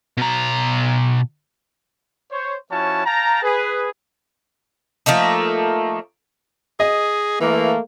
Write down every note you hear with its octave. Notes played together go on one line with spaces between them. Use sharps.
B2 A#5
C5 C#5
F3 C#4 E4 F#4 C#5 A5
F5 G5 A5 A#5
G#4 B4
F3 A3 A#3 D#4
G#4 D#5
E3 A3 A#3